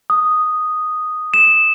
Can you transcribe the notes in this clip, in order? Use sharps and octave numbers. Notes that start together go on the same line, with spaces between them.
D#6
E7